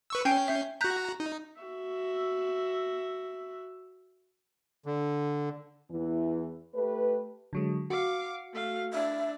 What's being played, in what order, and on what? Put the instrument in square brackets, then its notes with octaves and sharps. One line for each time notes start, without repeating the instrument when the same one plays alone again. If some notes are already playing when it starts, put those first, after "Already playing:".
[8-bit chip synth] B4 C#6 E6
[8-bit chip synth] C#4 G6 C7 [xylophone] G5 G#5 D7
[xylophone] E5
[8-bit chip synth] F#4 A#5 [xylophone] F#6 G6 B6
[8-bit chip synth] D#4
[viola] F#4 E5
[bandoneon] D3
[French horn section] E2 E3
A3 G4 B4
[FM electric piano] D3 F#3 G#3
[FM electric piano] F#4 [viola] F5 D6
[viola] A3 F5
[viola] D4 [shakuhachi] E5